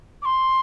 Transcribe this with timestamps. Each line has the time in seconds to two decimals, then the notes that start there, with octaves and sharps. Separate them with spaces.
0.22 D6
0.25 C6